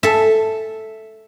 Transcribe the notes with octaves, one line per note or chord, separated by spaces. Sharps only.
A4 E5